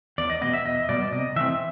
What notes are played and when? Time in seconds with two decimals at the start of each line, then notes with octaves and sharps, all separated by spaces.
0.18 E2 D5
0.30 D#5
0.41 B2 G3 B3 D#5
0.53 E5
0.65 E2 D#5
0.89 B2 G3 B3 D5
1.12 C3 D#5
1.36 E3 A3 C4 E5